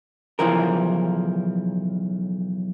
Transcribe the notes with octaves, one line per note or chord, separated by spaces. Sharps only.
B1 C#3 E3 F3 A#4